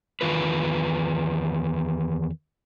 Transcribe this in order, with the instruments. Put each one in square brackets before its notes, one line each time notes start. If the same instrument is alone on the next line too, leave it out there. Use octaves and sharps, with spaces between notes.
[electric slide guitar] E2 A#2 D#3 F4 B4